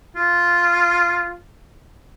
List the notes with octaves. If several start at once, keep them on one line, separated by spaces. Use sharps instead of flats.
F4